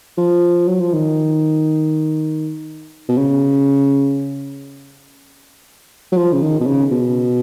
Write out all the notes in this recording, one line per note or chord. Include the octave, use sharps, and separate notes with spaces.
F3
F#3
F3
D#3
B2
C#3
F#3
F3
C#3
D#3
B2
C#3
B2